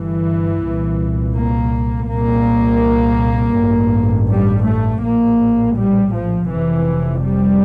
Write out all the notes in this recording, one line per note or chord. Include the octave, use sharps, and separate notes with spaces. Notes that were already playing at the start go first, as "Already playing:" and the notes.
Already playing: G1 G2 E3
C2 A#2
A#3
C2 A#2 A#3
A1 G2
G3
A3
A#1 A2 A#3
G3
F3
F1 F2 C3 E3
G3